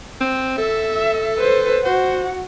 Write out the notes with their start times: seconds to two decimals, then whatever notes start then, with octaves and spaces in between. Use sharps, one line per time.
0.21 C4
0.58 A4 E5
1.38 B4 C5
1.85 F#4 C5 F#5